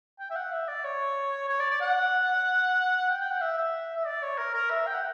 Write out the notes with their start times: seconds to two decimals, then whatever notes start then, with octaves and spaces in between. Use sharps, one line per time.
0.20 G5
0.30 E5
0.36 F#5
0.52 E5
0.68 D5
0.84 C#5
1.49 C#5
1.60 D5
1.70 D5
1.81 F#5
3.10 G5
3.20 G5
3.31 F#5
3.41 E5
3.57 E5
3.96 E5
4.06 D5
4.22 C#5
4.38 A#4
4.54 A#4
4.70 E5
4.87 G5
4.95 F#5